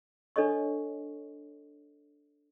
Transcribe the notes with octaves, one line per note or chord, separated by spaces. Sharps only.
D4 A4 C#5 D#5 C#6